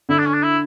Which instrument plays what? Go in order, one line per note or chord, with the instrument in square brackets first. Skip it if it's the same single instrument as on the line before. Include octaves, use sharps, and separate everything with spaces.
[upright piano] D3 [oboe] E4
[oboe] D4
C#4
D4
E4